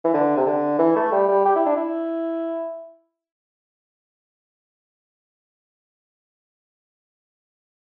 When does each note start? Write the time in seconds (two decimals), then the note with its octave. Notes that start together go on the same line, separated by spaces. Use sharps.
0.05 E3
0.14 D3
0.37 C3
0.46 D3
0.78 E3
0.96 A3
1.12 G3
1.29 G3
1.45 G4
1.55 E4
1.66 D4
1.76 E4